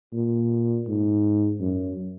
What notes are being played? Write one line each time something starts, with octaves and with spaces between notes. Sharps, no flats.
A#2
G#2
F#2